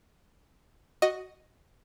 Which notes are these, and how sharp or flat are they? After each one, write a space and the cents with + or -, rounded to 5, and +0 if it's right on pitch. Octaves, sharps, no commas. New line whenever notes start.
F#4 +0 D#5 +0